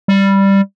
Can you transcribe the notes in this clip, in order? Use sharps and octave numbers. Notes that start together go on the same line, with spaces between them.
G3